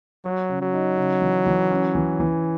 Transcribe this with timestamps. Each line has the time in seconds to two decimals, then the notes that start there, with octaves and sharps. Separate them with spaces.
0.25 F#3 F#4
0.49 C#3
0.61 F#3
0.74 D#4
0.97 C#3
1.22 E3
1.46 E3
1.71 C#4
1.95 E3
2.20 E3